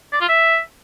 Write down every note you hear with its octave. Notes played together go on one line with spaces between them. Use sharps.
D5
F4
E5